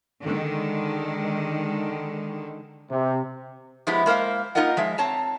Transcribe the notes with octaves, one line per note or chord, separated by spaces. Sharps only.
D3 D#3 G#3
C3
F3 G#3 B3 E4 G4
G#3 A#3 A#4 C5 F5
A#3 D#4 F4 A#4 D#5 F#5
F3 G#3 E5
C4 C#5 A5 A#5